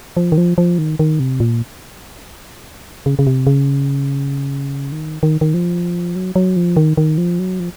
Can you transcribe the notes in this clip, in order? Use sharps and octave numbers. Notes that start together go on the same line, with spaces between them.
F3
D#3
F3
F3
D#3
D#3
C3
A#2
C#3
C#3
C3
C#3
D#3
D#3
D#3
F3
F#3
F#3
F3
D#3
D#3
F3
F#3
F3